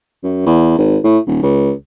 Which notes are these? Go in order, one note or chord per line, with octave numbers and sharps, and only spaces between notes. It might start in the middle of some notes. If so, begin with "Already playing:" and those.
F#2
E2
G#1
A2
D#1
C#2